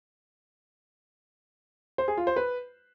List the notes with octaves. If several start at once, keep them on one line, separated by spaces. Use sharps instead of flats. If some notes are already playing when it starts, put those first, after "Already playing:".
C5
G#4
F4
C5
B4